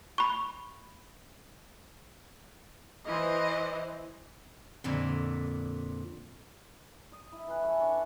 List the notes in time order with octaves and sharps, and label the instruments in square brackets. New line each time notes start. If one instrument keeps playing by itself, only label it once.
[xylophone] B5 C#6
[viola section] E3 C5 [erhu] D#5
[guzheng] F2 A#2 D3 E4
[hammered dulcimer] D#5
E4
E3 A4 B4
C#4 A4 G#5
D4 D5 C#6 D6